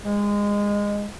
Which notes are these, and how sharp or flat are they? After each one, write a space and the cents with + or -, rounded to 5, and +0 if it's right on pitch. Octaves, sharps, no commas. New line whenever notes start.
G#3 -20